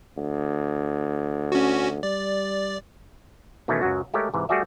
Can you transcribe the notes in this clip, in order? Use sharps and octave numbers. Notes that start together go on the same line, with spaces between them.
D2
C#4 F#4
G3 D5
B2 D#3 E3 A3 C#4
C#2 F#2 F#3 F#4
G#3 A3 G4 A4 A#4 C#5
G#2 C3 E3
G3 A3 F#4 G#4 D5 E5